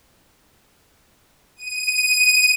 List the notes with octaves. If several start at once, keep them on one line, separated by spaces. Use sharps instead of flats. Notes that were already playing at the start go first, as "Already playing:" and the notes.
D#7